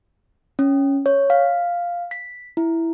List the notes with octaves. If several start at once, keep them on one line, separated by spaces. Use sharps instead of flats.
C#4
C#5
F5
B6
E4